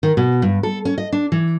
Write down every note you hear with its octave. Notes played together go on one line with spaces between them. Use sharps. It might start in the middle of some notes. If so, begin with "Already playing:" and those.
D#3
B2
G2
A4
C#4
D#5
D4
E3